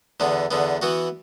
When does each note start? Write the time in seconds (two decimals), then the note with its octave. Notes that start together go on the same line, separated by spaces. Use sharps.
0.20 E2 D3 B3
0.51 E2 D3 B3
0.82 E3 B3 F#4